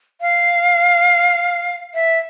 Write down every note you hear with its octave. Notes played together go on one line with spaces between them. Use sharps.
F5
E5